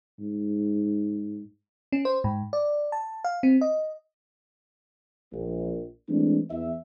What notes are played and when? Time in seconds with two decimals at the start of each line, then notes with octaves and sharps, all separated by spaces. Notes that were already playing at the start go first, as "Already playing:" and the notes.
0.20 G#2
1.92 C#4
2.05 C5
2.24 G#2
2.53 D5
2.92 A5
3.24 F5
3.43 C4
3.61 D#5
5.32 A#1
6.09 E3 G#3 A3 C4 D4
6.50 E2 E5